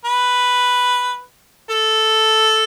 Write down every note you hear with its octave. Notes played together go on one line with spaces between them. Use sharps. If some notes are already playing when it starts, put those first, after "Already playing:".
B4
A4